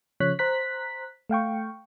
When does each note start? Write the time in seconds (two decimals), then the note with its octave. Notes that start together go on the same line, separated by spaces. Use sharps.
0.20 C#3 F3 C#5 F#6 B6
0.39 C5 A#5 F#6 B6
1.29 A3 F5 G5 C#6